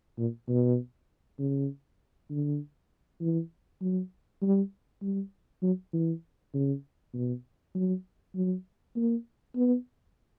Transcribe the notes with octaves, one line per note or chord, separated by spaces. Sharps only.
A#2
B2
C#3
D3
E3
F#3
G3
G3
F#3
E3
C#3
B2
F#3
F#3
A#3
B3